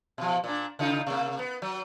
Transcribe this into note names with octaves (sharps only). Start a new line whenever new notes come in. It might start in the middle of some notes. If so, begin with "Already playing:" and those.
B2 F3
A#2 D4
C#3 D#4 F4
C3 A#3
B3
F#3